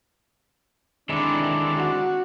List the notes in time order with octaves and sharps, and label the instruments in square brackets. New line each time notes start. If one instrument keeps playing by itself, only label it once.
[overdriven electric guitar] D3 D#3 [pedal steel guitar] G#3 C4 E4 [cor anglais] D4
[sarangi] F#4